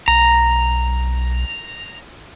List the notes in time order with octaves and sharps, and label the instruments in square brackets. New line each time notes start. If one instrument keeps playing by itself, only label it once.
[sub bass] B1 [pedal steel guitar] A#5